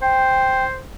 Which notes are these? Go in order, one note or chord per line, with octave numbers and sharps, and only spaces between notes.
C5 G5